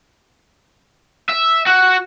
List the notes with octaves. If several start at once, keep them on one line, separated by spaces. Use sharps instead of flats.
E5
F#4